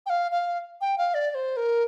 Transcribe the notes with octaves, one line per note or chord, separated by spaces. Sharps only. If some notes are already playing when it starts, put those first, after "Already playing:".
G5
F5
F5
G5
F5
D5
D5
C5
A#4